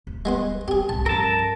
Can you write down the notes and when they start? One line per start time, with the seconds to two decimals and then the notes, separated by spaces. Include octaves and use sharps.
0.07 D1
0.25 G3 G#3 B3 C5
0.68 C4 G4 G#4
0.89 C2 A2 A5
1.06 G2 F3 C#4 A4 A#4 A5